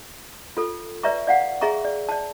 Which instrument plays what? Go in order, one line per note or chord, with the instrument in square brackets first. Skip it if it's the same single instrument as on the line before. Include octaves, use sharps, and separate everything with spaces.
[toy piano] F4 A4
B4 D5 E5 A#5 C#6
D5 F5 F#5
G#4 E5 A#5 C#6
D5
D5 A5